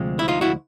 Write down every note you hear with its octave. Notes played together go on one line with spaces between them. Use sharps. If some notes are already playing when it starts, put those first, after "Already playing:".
Already playing: D2 C3 F3 G#3
E4
D#4 F4
E4 F#4